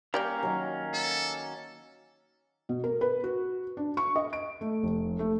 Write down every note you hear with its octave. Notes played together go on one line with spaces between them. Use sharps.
G3 A#3 C#4 A#4 D5 G5
D#3 F#3
A4 G#5
B2
A#4
B4
F#4
D4
C#6
D#5
D7
A3
F1
A3